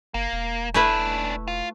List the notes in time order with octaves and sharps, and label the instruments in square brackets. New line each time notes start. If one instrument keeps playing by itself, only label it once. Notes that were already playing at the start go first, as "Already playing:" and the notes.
[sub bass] F#1 [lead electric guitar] A#3
[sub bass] E1
[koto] A3 E4 B4 [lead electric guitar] C#4 D4
[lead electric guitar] F4